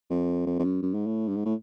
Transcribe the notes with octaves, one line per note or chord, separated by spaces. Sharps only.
F2
F2
F2
F#2
F#2
G#2
A2
G2
G#2
A2